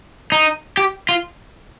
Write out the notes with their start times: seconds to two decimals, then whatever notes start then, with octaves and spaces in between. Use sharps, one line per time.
0.32 D#4
0.77 G4
1.09 F4